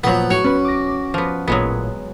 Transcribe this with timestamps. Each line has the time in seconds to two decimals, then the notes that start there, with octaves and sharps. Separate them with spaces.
0.04 A#2 F3 F#3 B3 F#5
0.30 A2 F#4 C#5
0.44 B3 C#4 B4
0.65 D6 A#6
1.14 F3 B3
1.47 A1 A#2 F#3 G#3 B3